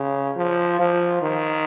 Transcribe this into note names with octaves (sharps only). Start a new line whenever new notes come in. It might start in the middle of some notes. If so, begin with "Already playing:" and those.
Already playing: C#3
F3
F3
D#3